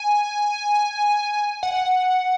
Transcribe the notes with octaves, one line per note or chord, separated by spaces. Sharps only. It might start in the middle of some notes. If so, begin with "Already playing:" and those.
Already playing: G#5
F#5